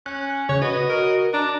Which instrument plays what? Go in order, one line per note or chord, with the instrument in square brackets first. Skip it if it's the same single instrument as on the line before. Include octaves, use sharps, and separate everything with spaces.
[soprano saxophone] C#4 [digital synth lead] F#6
[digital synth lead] C#3 [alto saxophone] C#5
[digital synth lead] F#4 [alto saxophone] B4 [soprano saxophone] D#5
[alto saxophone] A#4
[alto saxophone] D4 [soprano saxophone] A#5